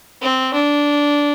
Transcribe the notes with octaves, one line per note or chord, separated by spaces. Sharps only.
C4
D4